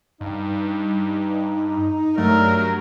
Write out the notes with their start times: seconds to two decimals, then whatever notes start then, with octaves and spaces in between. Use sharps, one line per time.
0.21 G2 D#4 F5
2.17 G2 F#3 A3 A#4